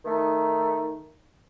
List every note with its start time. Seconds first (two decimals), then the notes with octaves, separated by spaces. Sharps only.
0.04 D#3 A3 D#4